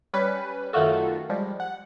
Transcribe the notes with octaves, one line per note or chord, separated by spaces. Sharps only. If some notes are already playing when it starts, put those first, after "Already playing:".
G3 C#4 B4
F#2 D#3 A3 F4 F#4 A4
F3 G3 G#3
F#5